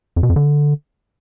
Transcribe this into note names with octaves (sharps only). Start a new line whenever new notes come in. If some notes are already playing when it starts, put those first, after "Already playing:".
F2
B2
F2
D3